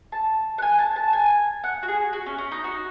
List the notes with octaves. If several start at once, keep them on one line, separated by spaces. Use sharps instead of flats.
A5
F#5
G#5
A5
A5
G#5
F#5
F#4
G#4
F#4
C#4
C#4
D#4
F#4